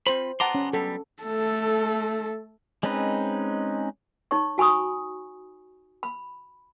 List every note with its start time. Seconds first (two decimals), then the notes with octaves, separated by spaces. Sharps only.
0.07 C4 F4 C5 B5
0.40 B3 F#5 A5 A#5 C6 D6
0.55 C#4
0.73 F#3 G3 B3 A4
1.23 A3 A4
2.83 G#3 C4 C#4 D#4 B4
4.31 D#4 C#5 C#6
4.58 F#4 G#5 B5 C#6 D#6
6.03 B5